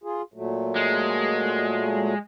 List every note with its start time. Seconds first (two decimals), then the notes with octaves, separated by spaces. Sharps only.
0.04 F4 G#4
0.34 A#2 F#3 A3
0.76 G#3